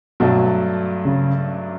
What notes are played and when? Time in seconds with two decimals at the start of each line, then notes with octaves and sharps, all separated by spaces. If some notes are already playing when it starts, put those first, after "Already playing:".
0.20 G2 B2 F#3 A3 D4
1.05 C#3